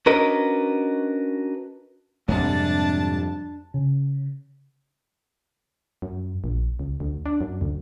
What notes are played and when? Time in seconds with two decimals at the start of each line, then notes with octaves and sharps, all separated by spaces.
0.06 C#4 D4 F#4 A#4 B4 D#5
2.28 F2 G#2 C3 G3 D4 A5
3.74 C#3
6.02 F#2
6.44 A#1
6.79 C#2
7.00 D2
7.26 D4
7.41 F#2
7.61 D2